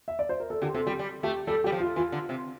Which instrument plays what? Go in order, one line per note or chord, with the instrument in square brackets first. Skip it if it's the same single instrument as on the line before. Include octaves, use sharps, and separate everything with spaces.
[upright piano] E5
D5
C5
A#4
A4
[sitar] D3 [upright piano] G4
[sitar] C3 [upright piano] A4
[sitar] G3 [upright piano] G4
[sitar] G3
[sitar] A3 [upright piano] G4
[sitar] G3 [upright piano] A4
[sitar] G3 [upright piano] G4
[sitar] F3
[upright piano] F4
[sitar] E3 [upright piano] F4
[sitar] D3
C3